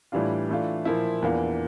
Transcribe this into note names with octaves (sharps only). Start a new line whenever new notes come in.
A2 E3 G3 D4 F4
E3 A3 D4 F4
A#2 F3 A#3 E4
E2 E3 A#3 D4 F4